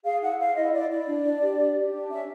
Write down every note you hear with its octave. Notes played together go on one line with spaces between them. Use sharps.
G#4 F5
E4 F#5
C5 F5
E4 D#5
E4 D5
E4 D5
D4
D4
G4
G4
G4
D4
C#4 E5